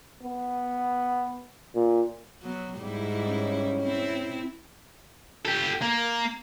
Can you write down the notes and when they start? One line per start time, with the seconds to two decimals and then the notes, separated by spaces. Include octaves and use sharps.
0.23 B3
1.75 A#2
2.43 F#3 B3
2.77 G#2 G3 E4
3.28 C#4
3.81 C4 E4
5.46 G4 A4
5.81 A#3